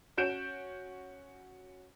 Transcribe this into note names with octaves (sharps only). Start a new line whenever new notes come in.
C#4 F#4 G6 D7 E7